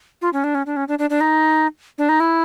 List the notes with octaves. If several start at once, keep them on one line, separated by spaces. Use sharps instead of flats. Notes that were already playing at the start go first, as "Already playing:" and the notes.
F4
C#4
D4
C#4
D4
C#4
D4
D4
D4
D#4
D4
D#4
E4